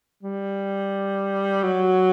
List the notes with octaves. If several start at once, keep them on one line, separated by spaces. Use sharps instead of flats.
G3
F#3